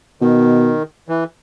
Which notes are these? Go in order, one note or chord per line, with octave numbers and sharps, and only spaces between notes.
B2 D#3
E3